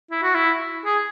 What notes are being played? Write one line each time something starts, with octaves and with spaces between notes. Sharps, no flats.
E4
F#4
E4
G#4